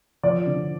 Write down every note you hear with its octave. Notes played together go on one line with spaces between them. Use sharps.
F3 D5
D3